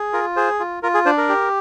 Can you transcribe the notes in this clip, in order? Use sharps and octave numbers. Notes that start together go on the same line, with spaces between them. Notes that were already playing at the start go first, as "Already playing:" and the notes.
Already playing: G#4
F4 A#4
G#4 C5
F4
F4 A#4
G#4
D4 C5
A#4
G4